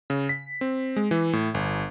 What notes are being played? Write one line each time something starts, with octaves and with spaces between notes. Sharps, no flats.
C#3
B6
C4
G#3
E3
A2
G1